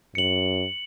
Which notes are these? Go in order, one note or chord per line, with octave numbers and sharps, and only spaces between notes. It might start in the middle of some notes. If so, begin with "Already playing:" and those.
F#2 C#7 F#7